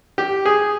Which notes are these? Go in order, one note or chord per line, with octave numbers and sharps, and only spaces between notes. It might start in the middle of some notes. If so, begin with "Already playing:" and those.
G4
G#4